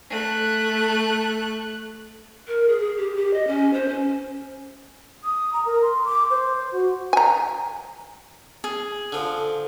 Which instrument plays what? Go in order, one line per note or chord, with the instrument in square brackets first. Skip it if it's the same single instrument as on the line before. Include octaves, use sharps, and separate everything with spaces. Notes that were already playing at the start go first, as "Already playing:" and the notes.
[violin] A3 F#6
[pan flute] A#4
G#4
G#4
G4
G4
D#5
C#4
C5
C#4
[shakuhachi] D#6
A#5
A#4
C6
D6
C5
C5
F#4
[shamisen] G#5 A#5
[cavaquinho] G#4
[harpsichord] D3 F3